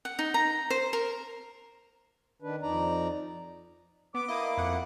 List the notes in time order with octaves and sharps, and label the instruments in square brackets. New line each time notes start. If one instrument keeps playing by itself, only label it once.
[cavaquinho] F#5
D#4
A#5
C5
A#4
[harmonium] D#3 D4 B4
F2 D#4 D5 A#5
[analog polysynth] B3 [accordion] D6
[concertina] A#3 E4 [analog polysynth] D#5
[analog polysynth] F2 F#5